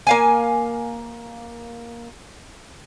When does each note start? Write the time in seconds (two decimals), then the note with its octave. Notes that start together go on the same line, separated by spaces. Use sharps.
0.07 A#3 F5 G#5